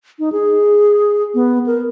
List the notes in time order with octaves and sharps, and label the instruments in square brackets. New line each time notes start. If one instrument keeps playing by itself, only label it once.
[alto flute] D#4
G#4
B3
A#4